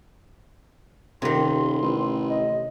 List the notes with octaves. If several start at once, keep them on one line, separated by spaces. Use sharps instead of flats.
D#1 C3 D#3 C6
A1
D#5